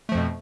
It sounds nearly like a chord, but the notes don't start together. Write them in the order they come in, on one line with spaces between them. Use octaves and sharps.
A3 F3 F2 B2